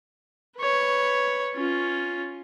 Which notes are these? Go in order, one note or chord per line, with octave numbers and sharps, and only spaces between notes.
B4 C#5
C#4 F4